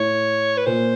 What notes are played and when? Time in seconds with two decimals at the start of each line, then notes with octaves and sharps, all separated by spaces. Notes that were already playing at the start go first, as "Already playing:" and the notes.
Already playing: A2 C#5
0.57 B4
0.66 A#2 C5